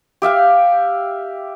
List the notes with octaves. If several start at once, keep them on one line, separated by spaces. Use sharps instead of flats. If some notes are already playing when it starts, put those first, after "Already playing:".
G4 E5 F5 G5